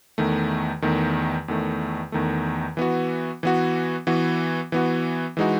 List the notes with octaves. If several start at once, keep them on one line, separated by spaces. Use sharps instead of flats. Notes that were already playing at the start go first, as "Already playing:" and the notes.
E2 D#3 A3
E2 D#3 A3
E2 D#3 A3
E2 D#3 A3
E3 B3 F#4
E3 B3 F#4
E3 B3 F#4
E3 B3 F#4
E3 G#3 D#4 F#4